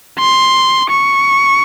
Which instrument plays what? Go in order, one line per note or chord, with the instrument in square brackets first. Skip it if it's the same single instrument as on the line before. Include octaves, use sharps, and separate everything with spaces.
[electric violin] C6
C#6